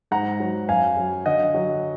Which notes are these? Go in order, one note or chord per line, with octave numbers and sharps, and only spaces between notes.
G#2 F#5 A#5
F#3
F#2 F5 G#5
F#3
D3 D#5 F#5
F#3